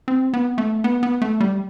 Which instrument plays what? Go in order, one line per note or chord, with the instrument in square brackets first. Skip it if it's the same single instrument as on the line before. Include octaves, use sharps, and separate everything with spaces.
[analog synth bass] C4
B3
A3
B3
B3
A3
G3